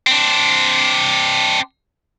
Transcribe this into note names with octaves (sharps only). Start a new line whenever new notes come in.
C4 D4